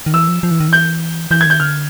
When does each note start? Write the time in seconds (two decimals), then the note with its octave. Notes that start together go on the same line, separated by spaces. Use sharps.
0.06 D#3
0.13 E3 E6
0.28 F3
0.43 F3
0.51 E3
0.60 D#3
0.68 E3 G6
1.31 E3 G6
1.41 G#6
1.46 D#3 G6
1.60 D3 F6